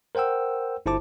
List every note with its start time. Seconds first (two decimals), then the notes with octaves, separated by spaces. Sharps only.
0.15 A#4 C5 F#5 G5 E6
0.86 G1 E4 C5 A5 D6